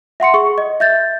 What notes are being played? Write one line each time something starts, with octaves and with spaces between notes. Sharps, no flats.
E5 F#5 C6 C#7
G#4 C#6
D#5
E5 G6 A6